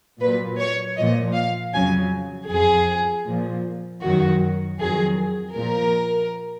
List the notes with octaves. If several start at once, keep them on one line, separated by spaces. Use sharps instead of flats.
A#2 F#3 B4
C#5
A#2 F3 D#5
F5
F2 C#3 F#3 G#5
F2 F3 G#4
A#2 F3
F#2 D#3 F#3 F#4
F2 D#3 F#3 G#4
A#2 F3 A#4